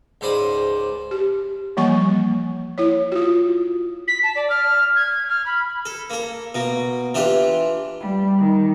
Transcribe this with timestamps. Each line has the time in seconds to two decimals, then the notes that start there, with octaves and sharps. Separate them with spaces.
0.21 C#2 G#2 C5 D5 B5 D#6
1.11 G4
1.77 E3 F3 G3 A#3 G#5 C#6
2.78 E4 C#5
3.12 F4 F#4
4.08 B6
4.23 A5
4.36 D5
4.50 F6
4.96 G#6
5.29 F6
5.46 B5
5.86 A4
6.10 A#3 A4
6.55 B2 A#3
7.15 E3 D4 F4 G4
8.01 G3
8.39 D#3